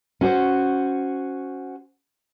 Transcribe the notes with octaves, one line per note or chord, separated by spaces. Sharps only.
C#4 F#4 C5